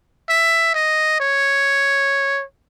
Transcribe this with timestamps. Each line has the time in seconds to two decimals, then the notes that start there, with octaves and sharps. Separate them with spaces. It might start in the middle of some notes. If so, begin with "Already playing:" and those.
0.29 E5
0.74 D#5
1.20 C#5